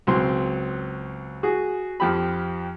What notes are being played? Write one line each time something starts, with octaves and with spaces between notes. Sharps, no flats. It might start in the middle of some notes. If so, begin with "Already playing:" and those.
C#2 F#3 C4 C6
F#4 G#4
F2 F3 G4 B5